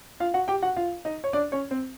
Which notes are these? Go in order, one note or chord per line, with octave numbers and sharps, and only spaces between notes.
F4 F5
F#4 F#5
G4 G5
F#4 F#5
F4 F5
D#4 D#5
C#5
D4 D5
C#4 C#5
C4 C5